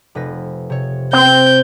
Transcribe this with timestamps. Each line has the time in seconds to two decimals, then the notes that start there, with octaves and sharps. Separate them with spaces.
0.15 F1 B4 A#6
0.70 C3 C#5
1.13 C4 G6